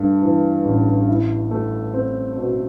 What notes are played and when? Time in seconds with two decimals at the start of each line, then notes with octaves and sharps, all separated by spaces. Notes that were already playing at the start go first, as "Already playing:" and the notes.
Already playing: G2 A3
0.22 E3
0.65 A1
1.08 E4
1.51 A3
1.94 C4
2.37 B2